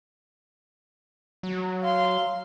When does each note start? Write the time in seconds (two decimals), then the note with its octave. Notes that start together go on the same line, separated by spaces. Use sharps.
1.43 F#3
1.82 F5 C6